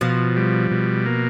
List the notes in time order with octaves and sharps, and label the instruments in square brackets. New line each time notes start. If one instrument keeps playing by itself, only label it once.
[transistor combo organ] B2 [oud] F3
[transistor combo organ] G3
B2
A#3